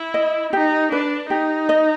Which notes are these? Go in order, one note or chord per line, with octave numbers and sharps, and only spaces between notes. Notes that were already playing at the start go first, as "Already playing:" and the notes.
Already playing: E4
D#5
D#4 G4
D4 B4
D#4 G4
D#5